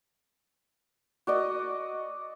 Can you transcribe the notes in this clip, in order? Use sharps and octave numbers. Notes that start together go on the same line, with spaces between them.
F#4 D5 D#5